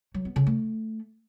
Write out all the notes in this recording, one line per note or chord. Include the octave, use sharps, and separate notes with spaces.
F#3
B3
C#3
A3